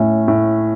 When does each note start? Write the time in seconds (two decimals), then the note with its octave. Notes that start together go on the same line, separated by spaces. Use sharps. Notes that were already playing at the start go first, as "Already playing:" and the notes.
Already playing: A2 A3 C#4
0.28 A2